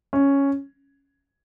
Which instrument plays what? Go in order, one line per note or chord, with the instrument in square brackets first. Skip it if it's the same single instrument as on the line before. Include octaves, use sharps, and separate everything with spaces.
[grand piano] C#4